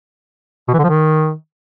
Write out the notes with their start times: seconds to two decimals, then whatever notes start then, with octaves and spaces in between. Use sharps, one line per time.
0.68 B2
0.74 E3
0.79 D3
0.84 F3
0.89 D#3